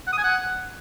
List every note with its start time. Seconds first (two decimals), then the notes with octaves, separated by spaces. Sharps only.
0.07 F#5
0.13 D#6
0.18 G#5
0.23 F#5